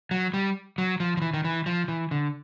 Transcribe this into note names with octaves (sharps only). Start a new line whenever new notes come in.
F#3
G3
F#3
F3
F3
E3
D#3
E3
F3
E3
D3